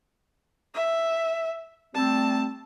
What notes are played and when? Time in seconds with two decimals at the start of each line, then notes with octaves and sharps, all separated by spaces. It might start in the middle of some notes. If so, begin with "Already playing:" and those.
0.75 E5
1.95 G3 A3 C4 A5